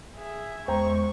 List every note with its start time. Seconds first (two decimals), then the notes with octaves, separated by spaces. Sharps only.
0.16 G#4 E5
0.68 E2 G#3 C5 G5 A#5 C#6